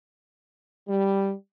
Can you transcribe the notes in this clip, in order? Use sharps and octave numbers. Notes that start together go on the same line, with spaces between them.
G3